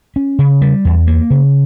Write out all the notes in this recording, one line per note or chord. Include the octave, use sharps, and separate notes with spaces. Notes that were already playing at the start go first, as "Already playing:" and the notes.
C#4
C#3
G3
E2
A#3
C#3